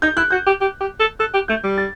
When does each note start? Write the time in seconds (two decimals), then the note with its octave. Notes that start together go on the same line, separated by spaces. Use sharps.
0.02 D#4 G6
0.17 E4 F#6
0.31 F#4 G6
0.46 G4
0.61 G4
0.80 G4
1.00 A4
1.19 A4 F#6
1.34 G4
1.48 A3 G6
1.63 G3
1.78 A6